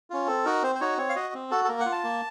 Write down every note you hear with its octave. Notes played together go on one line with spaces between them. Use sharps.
C#4 F4
C4 A4
D#4 F#4 A#4
C4 C5
C5
D#4 F#4 C#5
C4 C#5
F5
F#4 D#5
C4
F#4 A4
A4
A#3 A#4
F#5
F4
A5
A#3